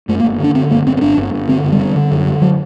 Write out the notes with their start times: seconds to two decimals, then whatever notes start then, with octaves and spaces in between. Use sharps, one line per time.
0.08 F#2 A3
0.20 A#3
0.24 G1
0.39 D3 D4
0.55 D3 C4
0.70 G1 A#3
0.86 G1 C4
0.97 C4
1.01 G1 D4
1.17 G1
1.33 G1
1.49 D3 C4
1.64 F#1
1.72 G3
1.80 D3
1.96 D3
2.11 F#2
2.27 D3
2.42 F#3